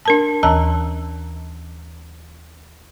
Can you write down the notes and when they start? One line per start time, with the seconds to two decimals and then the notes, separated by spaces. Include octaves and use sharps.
0.05 D4 A#4 A5
0.43 D#2 E3 A5 A#5 E6